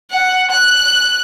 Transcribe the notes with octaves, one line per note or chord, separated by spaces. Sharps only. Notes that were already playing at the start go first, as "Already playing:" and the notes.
F#5
F#6